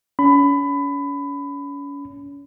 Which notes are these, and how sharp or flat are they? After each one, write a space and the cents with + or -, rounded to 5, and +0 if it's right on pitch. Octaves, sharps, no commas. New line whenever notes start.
C#4 +35 B5 +20